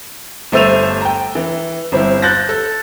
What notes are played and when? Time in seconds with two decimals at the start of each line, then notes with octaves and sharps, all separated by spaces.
0.52 G1 A3 C5 E6 D#7 F7
1.01 G5 A#5
1.35 E3
1.92 G1 C4 E4
2.22 F#6 G6 A6 A#6
2.49 A4